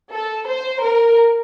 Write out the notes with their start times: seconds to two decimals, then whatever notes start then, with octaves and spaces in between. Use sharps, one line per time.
0.12 A4
0.47 C5
0.82 A#4